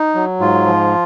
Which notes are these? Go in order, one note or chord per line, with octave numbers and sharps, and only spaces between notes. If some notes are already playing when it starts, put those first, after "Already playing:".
Already playing: D#4
F#3
G#2 F4
F3